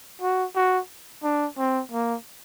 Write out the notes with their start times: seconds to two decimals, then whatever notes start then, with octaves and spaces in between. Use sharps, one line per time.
0.22 F#4
0.56 F#4
1.23 D4
1.58 C4
1.92 A#3